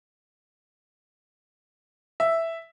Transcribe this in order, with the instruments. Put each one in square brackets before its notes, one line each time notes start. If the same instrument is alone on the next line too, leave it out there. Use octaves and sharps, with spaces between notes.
[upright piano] E5